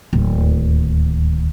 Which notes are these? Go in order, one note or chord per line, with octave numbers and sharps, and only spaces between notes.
D1 D#2